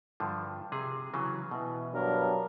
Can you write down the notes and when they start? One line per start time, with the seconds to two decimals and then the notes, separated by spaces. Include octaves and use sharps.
0.20 G2 D3 F3
0.72 C3 G#4
1.14 C#3 E3 F#3
1.51 B2 E3
1.94 G2 F#3 B3 D4 A#4